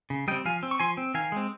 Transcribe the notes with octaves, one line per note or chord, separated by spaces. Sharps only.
C#3
G3 C4 D#5 G5
F3 F5 G#5
C4
C#6
F3 G#5 C6
C4
D#3 F5 G#5
G#3 C4